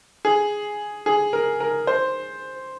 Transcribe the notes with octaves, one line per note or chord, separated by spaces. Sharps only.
G#4
G#4
A#4
A#4
C5